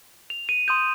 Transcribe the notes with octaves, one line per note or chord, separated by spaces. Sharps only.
F7
D#7
C6 D#6 G6 D#7